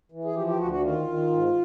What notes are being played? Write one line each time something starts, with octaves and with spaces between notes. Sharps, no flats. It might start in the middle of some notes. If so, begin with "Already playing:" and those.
E3
G#4
F3 G4
G4
D2 F#4
F#4
D#3 F4
D#3
G#2